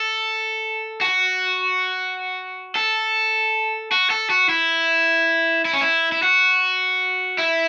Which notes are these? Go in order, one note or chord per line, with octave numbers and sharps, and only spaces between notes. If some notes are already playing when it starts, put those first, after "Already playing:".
Already playing: A4
F#4
A4
F#4
A4
F#4
E4
E4
C#4
E4
E4
F#4
E4